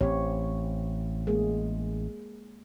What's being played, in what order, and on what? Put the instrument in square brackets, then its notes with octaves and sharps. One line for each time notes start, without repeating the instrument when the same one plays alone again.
[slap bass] A1 [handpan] C4 G4 C#5
[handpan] G#3 A#3 G#4